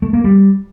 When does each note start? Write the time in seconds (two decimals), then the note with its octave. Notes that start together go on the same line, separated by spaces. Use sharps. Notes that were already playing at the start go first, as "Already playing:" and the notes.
0.02 A3
0.13 A#3
0.24 G3